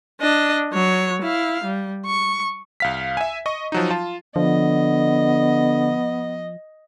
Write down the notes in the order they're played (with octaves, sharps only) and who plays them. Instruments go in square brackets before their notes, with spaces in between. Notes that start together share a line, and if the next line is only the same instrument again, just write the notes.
[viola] D4 D#5
F#3 C#5
E4 F5
G3
C#6
[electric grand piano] C2 F5 B6
E5 G#5
D#5 C#6
F3 F#3 D#4
F4 A5
[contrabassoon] D3 [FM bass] F3 [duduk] B3 [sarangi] D#5